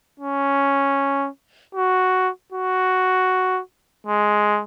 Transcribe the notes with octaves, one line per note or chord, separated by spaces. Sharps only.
C#4
F#4
F#4
G#3